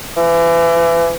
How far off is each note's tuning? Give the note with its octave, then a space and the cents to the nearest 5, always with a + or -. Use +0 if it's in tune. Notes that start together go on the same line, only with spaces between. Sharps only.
E3 +30